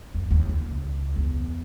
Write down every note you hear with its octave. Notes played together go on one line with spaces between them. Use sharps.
F2
D#2
C#2
E2